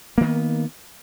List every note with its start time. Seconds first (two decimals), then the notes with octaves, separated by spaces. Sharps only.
0.18 A#3
0.21 D#3
0.24 B3